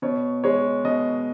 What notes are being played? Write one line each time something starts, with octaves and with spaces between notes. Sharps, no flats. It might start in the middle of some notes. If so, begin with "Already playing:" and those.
B2 C#5
G#3 C#5
B2 D#5